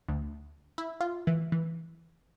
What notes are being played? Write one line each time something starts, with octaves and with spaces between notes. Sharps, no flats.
D2
E4
F4
E3
E3